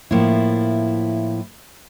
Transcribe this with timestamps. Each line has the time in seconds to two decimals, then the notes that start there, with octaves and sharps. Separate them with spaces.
0.11 A2 F3 A#3 E4